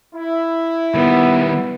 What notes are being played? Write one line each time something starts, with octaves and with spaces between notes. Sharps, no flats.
E4
D#3 G3 B3